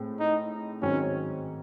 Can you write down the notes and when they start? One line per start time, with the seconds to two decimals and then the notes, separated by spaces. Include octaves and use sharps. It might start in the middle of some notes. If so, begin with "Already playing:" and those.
Already playing: A2 G#3 C4
0.19 D#4
0.81 G#2 D#3 F#3 C4 C#4